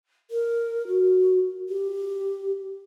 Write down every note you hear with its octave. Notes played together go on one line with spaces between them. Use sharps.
A#4
F#4
G4